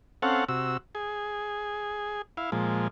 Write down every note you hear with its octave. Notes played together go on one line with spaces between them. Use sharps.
C4 C#4 A4 F5 F#5
C3 F#4 E6
G#4
E4 F5
A#2 F3 G#3